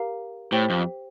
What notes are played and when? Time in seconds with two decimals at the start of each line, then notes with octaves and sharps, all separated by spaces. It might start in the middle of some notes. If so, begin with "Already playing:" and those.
Already playing: G4 A#4 F5 A#5
0.52 A2 G4 C5 G5
0.70 F2